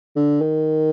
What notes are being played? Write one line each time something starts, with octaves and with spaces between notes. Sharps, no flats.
D3
D#3